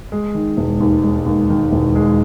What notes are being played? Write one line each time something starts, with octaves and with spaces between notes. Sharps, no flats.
G#3
D#3
E1
D#2
G#3
D#2
D#3
E1
G#3